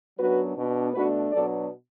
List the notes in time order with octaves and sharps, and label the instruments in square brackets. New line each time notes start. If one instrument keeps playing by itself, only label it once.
[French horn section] F#2 F#3 B3 D4 F#4 B4
B2 B3 D4
B2 A3 D4 F#4 B4
B2 F#3 B3 D4 A4 D5